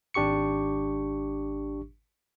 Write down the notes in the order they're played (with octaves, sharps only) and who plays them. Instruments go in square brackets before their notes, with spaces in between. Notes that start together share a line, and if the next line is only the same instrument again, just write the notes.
[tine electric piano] G#1 D4 G4 C#6 C#7